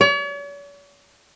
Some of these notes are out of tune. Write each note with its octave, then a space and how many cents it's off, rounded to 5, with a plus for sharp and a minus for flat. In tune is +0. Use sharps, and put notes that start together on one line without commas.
C#5 +45